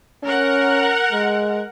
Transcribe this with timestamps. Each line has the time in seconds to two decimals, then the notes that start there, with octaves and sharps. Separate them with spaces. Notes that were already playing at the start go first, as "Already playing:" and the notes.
0.23 C#4 A#4 F#5
1.12 G#3